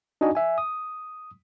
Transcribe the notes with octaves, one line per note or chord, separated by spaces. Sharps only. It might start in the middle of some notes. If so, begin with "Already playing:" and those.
D4 D#4 F#4 D#5 G#5
E5 G#5
D#6